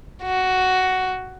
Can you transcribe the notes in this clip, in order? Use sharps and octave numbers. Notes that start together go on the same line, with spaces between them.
F#4